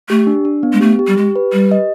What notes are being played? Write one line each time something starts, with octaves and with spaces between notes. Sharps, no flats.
A3 G4
D4
D4
B3
G#3
A3 G4
G4
G3
G#3 G4
B4
G3 G4
D#5